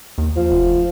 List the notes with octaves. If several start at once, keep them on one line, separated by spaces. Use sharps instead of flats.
D#2
F3
F1